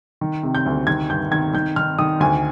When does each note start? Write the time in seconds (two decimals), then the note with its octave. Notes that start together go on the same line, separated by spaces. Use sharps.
0.21 D#3
0.43 C3
0.55 G6
0.66 D2
0.87 D#3 G#6
1.10 G2 G6
1.31 D#3 G#6
1.53 D#3 G6
1.76 D#3 F6
1.99 D#3 D#6
2.20 D2 G#5